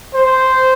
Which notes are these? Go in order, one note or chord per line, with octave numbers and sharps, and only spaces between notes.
C5